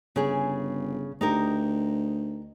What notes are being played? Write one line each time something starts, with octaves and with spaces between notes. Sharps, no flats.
G1 C#3 G#4
D2 D#4 G4 A#4